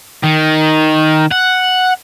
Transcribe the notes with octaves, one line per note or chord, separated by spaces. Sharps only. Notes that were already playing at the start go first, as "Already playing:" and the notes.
D#3
F#5